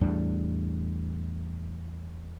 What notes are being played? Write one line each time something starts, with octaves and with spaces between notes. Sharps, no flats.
E2 A2 G3 D4